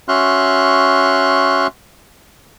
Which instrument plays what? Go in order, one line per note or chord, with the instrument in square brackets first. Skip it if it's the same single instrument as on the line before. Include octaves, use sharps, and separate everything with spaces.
[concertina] C#4 F#4 E5 C6 F6 F#6